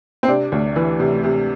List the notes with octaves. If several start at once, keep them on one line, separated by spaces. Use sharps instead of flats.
C4
C3 D4
D2
E3
C3
C3